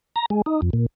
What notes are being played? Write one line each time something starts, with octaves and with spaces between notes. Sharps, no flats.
A#5
G#3
D#4
F2
A#2